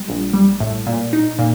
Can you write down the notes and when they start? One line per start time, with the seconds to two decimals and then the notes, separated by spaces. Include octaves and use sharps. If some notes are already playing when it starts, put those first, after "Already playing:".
Already playing: G3
0.08 A#1
0.33 G3
0.60 A2
0.86 A#2
1.13 D#4
1.39 A#2